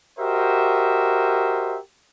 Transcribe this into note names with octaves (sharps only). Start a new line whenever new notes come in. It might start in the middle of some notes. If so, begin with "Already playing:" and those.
F#4 G4 A#4 C5 D#5 E5